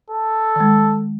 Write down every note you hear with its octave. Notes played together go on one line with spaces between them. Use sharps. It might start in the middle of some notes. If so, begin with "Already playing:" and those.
A4
D#3 G#3